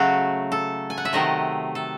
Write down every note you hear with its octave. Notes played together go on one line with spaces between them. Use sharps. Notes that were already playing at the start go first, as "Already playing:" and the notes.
Already playing: C#3 F#3 A3 F#4
A4
G#5
F#5
E5
C3 D#3 F#3 A3 D#5
A4